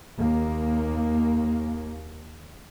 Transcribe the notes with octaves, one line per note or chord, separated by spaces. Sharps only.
D#2 A#3